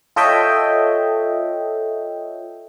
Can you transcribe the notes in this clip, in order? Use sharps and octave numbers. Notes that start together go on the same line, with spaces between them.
F4 A4 C#5 D#5 E5 G5